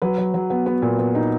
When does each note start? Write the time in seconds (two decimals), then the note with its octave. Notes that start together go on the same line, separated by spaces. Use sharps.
0.02 F#3 B4
0.18 F#3
0.34 F#3
0.50 B3
0.66 B3
0.82 A#2
0.98 B3
1.15 D#4